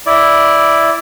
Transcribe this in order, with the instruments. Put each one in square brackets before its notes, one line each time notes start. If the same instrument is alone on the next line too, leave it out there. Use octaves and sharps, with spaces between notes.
[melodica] E4 D5